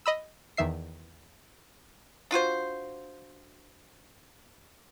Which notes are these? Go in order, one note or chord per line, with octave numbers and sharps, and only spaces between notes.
D#5 B5 E6
E2 D#3 E5 C7
D4 F4 F#4 C5